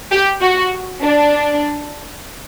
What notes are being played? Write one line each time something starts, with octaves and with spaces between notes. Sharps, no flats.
G4
F#4
D4